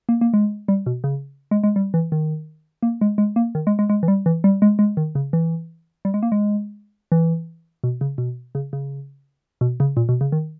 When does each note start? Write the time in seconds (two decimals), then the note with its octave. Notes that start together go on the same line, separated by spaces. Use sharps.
0.09 A#3
0.21 A#3
0.34 G#3
0.68 G3
0.86 B2
1.04 C#3
1.51 G#3
1.64 G#3
1.76 G3
1.94 E3
2.12 D#3
2.83 A#3
3.01 G#3
3.18 G#3
3.36 A#3
3.55 D#3
3.67 G#3
3.79 G#3
3.89 G#3
4.03 E3
4.08 G3
4.26 E3
4.44 G3
4.62 G#3
4.79 G#3
4.97 D#3
5.15 C#3
5.33 E3
6.05 G3
6.14 G#3
6.23 A#3
6.32 G#3
7.12 E3
7.84 B2
8.01 C#3
8.18 B2
8.55 C#3
8.73 C#3
9.61 B2
9.80 C#3
9.97 A#2
10.09 B2
10.21 C#3
10.32 D#3